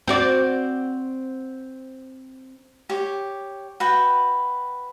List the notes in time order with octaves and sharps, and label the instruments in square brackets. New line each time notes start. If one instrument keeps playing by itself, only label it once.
[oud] C4 F#4 D5
[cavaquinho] G4 C#5
F#4 B4 G5